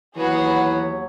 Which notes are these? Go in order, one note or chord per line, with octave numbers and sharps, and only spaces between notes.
D#2 E3 F#3 B3 F#4 G#4 C#5